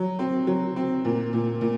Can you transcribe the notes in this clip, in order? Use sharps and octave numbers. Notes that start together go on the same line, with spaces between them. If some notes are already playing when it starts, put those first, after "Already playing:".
Already playing: F#3
C4
F#3
C4
A#2
A#2
A#2